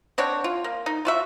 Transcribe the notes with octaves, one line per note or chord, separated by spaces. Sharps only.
C4 D4 C#5 F#5
F4
A#3
D#4
F4 F#4 E5